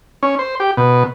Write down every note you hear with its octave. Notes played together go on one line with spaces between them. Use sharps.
C#4
C5
G4
B2